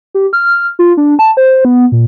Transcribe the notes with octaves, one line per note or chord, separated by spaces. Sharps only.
G4
F6
F4
D4
A5
C5
B3
A#2